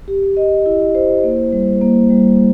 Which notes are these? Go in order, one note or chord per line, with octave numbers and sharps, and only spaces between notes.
G4
D#5
E4
C5
A#3
G3
A#3
G3